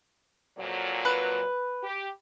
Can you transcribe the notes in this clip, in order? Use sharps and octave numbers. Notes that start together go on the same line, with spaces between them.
F2 A#2 F#3
B4
G4